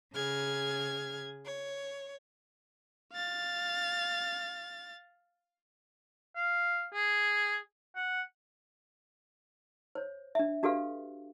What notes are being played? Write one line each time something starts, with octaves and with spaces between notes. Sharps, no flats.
C#3 G#4 F6 G#6
C#5
F5 A6
F5
G#4
F#5
C5 C#5
D4 E5
D4 F#4 G4 A4 B4 F5